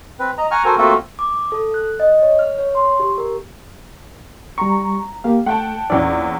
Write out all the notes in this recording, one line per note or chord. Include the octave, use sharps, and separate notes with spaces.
C4 B4
D#5 A#5
F#5 G#5 A#5 C#6 F6
F#4 A4 A#4 C5 G#5
A3 A#3 C4 F4 F#4 A4
D6
A4
F#6
D#5
C#5
F6
C#5
C6
G4
A#4
G3 A#5 C#6
A#3 G4 F5
A3 F#5 G5 A5
A#1 E2 C#4 D5